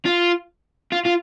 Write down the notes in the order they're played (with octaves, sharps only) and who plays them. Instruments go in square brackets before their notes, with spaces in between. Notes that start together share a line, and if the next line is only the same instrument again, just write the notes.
[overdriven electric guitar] F4
F4
F4